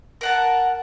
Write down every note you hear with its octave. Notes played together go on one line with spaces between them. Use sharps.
A#4 F#5 A5